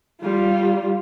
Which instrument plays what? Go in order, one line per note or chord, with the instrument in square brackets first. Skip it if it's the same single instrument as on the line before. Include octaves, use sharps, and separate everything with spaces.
[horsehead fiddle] G3 F4